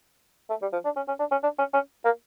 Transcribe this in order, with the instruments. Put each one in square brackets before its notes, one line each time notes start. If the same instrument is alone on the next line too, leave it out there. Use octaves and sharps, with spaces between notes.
[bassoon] A3
G3
F3
D4
C#4
C#4
D4
C#4
D4
C#4
C#4
A#3